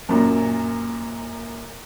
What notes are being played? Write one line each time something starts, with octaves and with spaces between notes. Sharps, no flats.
F#2 A#2